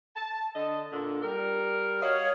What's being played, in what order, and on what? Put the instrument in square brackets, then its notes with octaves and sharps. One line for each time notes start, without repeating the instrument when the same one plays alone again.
[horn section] A5
D3 D#5
A#2 D3
G3 A#4
[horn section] F#4 D#5 F5 [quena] C#5